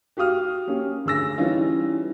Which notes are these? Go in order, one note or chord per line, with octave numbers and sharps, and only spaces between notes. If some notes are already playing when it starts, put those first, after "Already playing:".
F#4 G4 F5 D#6 F6
A#3 C#4 G4
D2 G#4 E6 A#6
E3 G3 C#4 D#4 F4